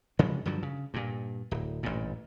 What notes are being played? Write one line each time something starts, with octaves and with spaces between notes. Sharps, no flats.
C#3 F3 F#3 G#3
G2 D3 F3 F#3
C#3
G2 A#2
D1
A1 G2 A#2